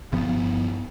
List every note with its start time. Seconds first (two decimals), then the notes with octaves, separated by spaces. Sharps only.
0.12 G1 G2 F3 B3